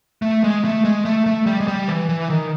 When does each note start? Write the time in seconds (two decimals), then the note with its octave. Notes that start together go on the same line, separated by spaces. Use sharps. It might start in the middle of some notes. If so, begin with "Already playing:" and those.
0.22 A3
0.44 G#3
0.65 A3
0.85 G#3
1.05 A3
1.26 A3
1.47 G3
1.60 G#3
1.68 G3
1.88 E3
2.09 E3
2.30 D#3